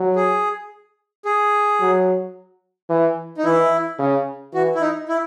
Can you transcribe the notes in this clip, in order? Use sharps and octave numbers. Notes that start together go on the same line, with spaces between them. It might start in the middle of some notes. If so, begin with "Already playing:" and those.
Already playing: F#3
G#4
G#4
F#3
E3
D#4
E3 E4
C#3
E3 F#4
E4
D#4
E4